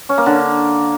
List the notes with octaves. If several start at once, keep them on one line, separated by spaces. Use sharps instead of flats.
C#4
A#3
D3